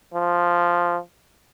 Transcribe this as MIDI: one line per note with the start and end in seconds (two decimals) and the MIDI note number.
0.14 0.98 53